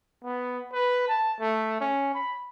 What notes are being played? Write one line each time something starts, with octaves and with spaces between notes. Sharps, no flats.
B3
B4
A5
A3
C#4
B5